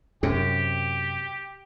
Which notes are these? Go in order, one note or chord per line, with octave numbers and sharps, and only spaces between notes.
F#2 C3 G4